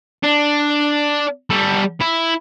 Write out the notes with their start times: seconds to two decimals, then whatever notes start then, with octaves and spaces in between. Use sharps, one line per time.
0.23 D4
1.50 G3 A4
2.01 E4